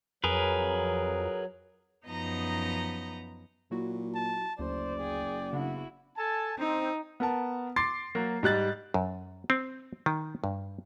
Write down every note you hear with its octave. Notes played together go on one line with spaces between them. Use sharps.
F2 F#3 G#4 A#4 B4
F#2 F3 B3 D#4 D#5 A#5
A#2 F#3 E4 F#4
A5
F#1 D2 C5 D5
G#4 G5
C#3 B3 D4 E4 F#4
A4 G#5 A5
C4 D#4
B3 A#4 A5
C6 D6 A6 C7
F#3 A#3 F#4
G#2 G3 F#6 A6
F#2
C4
D#3
G2